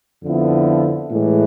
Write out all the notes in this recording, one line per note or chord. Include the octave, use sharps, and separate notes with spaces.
F2 D3 F3 B3 E4
A2 E3 G#3